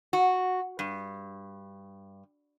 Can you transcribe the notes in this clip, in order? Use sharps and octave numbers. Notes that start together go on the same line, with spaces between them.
F#4
G2